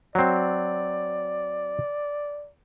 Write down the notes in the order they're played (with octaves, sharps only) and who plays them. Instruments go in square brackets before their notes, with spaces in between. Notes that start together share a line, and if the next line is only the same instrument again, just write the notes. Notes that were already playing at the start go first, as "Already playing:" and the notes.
[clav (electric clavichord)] F#3 C4 [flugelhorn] D5